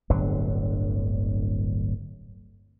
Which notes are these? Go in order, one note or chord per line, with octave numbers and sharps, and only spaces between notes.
D1 G1 D3 F#3